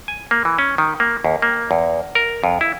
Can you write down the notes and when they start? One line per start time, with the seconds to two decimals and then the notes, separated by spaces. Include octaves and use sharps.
0.08 G#5
0.31 A#3
0.45 E3
0.59 C#4
0.78 D#3
1.00 A#3
1.25 D#2
1.42 A#3
1.71 E2
2.15 A#4
2.44 F2
2.61 E4